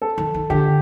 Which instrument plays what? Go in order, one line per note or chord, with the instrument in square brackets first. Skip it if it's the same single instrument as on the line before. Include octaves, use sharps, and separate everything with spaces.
[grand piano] A4
[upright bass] D#3
D#3
[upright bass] D3 [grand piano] G4